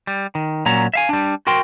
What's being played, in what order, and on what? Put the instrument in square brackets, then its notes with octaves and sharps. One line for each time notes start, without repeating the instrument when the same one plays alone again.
[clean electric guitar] G3
D#3
A#2 F#3 C#4 A#5
E5 F5 G#5
G3 D4
F#4 A#4 G5 C6